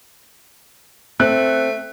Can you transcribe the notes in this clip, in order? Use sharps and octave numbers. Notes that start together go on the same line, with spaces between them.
A3 C4 F#6